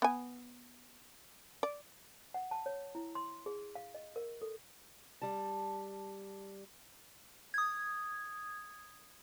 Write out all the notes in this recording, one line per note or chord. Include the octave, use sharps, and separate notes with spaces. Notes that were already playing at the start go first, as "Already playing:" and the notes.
B3 G#5
D5
F#5
A5
C#5
E4
C6
G#4
F5
D#5
A#4
A4
G3 A5
D#6 G#6